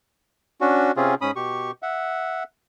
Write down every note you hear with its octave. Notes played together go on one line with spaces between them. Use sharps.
C#4 D4 F#4
C3 C4 C#4 F4 G#4
G#2 C#4 B5 D#6
B2 G4 C#6
E5 F#5